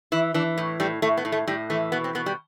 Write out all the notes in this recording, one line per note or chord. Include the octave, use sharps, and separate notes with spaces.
E3 E4
E3 D4
A2
A2 G3
A2 A3
B3
A2
A3
A2 G3
E3 A3
B2 B3
C4
B2 B3
G3